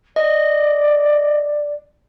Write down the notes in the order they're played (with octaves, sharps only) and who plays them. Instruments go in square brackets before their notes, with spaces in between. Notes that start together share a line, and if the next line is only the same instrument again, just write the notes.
[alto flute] D5 [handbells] D#5